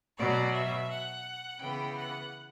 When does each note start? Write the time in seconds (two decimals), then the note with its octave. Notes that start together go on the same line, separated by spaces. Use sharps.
0.18 B2 F#3 B3 D5
0.53 E5
0.89 F#5
1.60 C#3 E3 B3 G5
1.96 F#5